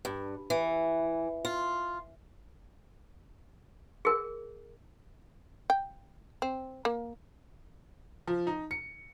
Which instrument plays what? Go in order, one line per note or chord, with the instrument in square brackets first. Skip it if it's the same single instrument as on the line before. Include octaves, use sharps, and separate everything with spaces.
[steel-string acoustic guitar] G2
E3
F4
[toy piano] G#4 A#4
[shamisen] G5
C4
A#3
[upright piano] F3
D#4
C#7